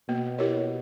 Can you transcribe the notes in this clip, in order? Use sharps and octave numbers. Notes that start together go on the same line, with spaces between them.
B2 A#3
E4 G4 A#4 C#5